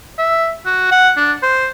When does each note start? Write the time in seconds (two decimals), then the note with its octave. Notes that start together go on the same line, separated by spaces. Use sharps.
0.19 E5
0.66 F#4
0.92 F#5
1.17 D4
1.43 C5